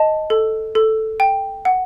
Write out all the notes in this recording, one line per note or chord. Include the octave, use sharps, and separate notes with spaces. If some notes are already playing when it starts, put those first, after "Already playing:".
Already playing: D#5 A5
A4
A4
G5
F#5